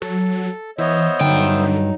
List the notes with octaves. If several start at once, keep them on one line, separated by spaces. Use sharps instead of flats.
F#3 A4
E3 B3 C5 C#5 D#5 E5
G2 D3 F#3 D#4 G5